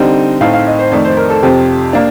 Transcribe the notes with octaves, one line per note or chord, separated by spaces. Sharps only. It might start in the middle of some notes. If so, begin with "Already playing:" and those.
Already playing: D3 G3 C4 D#4
A2 A3 C4 D#4 F5
F5
D#5
C5
F2 D#3 A3 D#4 D5
C5
A#4
A4
F2 C3 F3 G4
A#3 D4